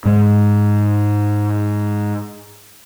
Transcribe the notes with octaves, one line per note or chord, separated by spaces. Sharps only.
G#2 G#3